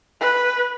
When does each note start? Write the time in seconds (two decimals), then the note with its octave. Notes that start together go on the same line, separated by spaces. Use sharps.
0.20 B4